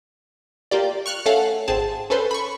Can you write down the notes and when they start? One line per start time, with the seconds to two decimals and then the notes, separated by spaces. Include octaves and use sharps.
0.71 A#3 F4 G4 D5
1.06 C#6 F6 F#6
1.25 A3 C#4 A4 F5 F#5
1.68 G#1 C4 G#4 A5
2.10 C#4 A4 B4 C5
2.31 B5 C#6